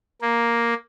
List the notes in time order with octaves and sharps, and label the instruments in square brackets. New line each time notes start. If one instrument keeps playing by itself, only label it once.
[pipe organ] A#3